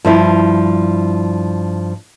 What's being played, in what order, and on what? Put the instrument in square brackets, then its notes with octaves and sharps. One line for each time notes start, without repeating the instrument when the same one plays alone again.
[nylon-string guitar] G2 F3 E4